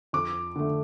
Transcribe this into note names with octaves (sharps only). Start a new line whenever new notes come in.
F2 D6
D3 A3